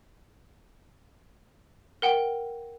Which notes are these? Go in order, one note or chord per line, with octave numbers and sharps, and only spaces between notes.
A#4 F#5 G5